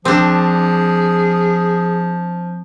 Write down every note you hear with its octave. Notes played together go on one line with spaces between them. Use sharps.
F3 C4 D4 G#4